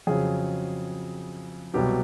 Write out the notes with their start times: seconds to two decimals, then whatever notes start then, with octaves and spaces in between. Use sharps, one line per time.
0.07 F2 C#3 F#3 G#4
1.74 C2 B2 F#3 G4